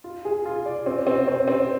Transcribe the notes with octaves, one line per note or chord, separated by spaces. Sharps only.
F4
G#4
F4
D5
C4
C4
C4
C4